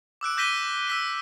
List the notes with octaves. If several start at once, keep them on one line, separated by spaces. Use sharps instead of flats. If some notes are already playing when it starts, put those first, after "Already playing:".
D6 E6 F#6 D7
D6 G6 A#6 B6 D#7 G7
E6 B6 D#7